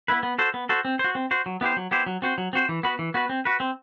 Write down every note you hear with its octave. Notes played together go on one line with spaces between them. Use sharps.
B3 E4 B4
B3
F#4 A4 C5
B3
F#4 A4 C5
C4
C5
F#4
C4
F#4 C5
F#3
B3 E4 G4 C5
F#3
B3 E4 G4 C5
F#3
C4 F#4 C5
F#3
C4 F#4 C5
E3
B3 F#4 B4
E3
B3 F#4 B4
C4
F#4 B4
C4